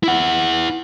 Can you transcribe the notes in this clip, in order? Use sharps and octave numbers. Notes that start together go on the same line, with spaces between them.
E4 F#5